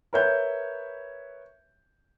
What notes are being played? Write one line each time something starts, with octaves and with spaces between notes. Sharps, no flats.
A#4 B4 C#5 E5 G6